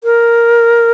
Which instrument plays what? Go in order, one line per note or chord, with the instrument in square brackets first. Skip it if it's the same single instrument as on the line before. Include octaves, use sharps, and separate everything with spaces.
[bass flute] A#4